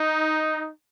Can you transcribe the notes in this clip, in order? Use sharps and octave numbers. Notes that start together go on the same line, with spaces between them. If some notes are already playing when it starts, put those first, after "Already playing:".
Already playing: D#4